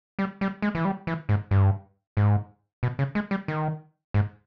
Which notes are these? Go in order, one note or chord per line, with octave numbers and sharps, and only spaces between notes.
G3
G3
G#3
E3
G3
E3
G#2
G2
G#2
B2
C#3
G#3
G3
D#3
G#2